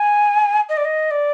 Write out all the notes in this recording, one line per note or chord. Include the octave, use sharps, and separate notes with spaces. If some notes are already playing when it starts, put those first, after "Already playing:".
Already playing: G#5
D#5
D5
D#5
D5